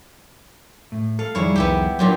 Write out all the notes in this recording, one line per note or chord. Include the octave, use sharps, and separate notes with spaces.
A2
A4 F5
F2 D#3 G3 E4 G#4 C#5
C2 B3 E4 G4
G2 A#2 F#3 G4